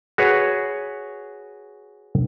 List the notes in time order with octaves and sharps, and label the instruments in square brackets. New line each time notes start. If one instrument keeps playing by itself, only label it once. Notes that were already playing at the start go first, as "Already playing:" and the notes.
[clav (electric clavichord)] F#4 G#4 B4 C#5